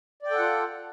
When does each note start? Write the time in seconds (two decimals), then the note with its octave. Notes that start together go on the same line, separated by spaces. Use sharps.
0.23 D5
0.27 G5
0.31 A4
0.35 F#5
0.39 F4